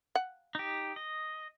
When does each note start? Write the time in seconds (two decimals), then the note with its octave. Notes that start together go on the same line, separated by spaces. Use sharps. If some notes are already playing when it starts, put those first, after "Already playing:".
0.15 F#5
0.55 D#4 G4
0.96 D#5